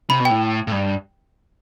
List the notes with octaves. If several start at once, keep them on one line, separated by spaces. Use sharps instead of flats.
C3 B5
B2
A2 G5
A2
G2